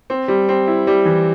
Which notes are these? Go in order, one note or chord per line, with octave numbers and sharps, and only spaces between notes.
C4
G3
C4
E4
G3
E3